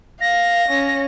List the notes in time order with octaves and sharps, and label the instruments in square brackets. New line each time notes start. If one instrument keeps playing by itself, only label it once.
[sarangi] F5 [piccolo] A#6
[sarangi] C#4